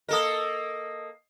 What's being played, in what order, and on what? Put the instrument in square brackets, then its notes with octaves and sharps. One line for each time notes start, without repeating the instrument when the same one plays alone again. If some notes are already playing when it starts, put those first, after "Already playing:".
[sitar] A#3 A4 A#4 [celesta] D#5 D#6